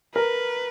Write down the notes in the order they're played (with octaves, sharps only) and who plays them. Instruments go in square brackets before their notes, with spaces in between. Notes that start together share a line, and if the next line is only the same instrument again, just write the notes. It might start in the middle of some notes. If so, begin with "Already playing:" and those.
[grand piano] A#4 [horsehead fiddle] B4